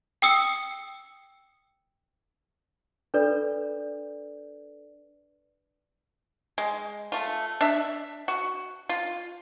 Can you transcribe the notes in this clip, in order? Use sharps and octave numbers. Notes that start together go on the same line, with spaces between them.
G5 D#6 E6 C#7
D4 A4 B4 D5
G#3
A3 F4
D4 E5
F#4
F4